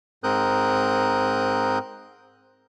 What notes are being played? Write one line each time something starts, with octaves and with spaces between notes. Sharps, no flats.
G#2 C4 A#4 D#6 F#6 G6